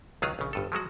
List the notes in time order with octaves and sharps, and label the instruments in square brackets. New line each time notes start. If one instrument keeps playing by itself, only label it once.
[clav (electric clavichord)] C#2 D#3 F#3 F4 G#4 A#5
A#1 C#3
G1 G2 A4
F3 F#3 G#3 F#4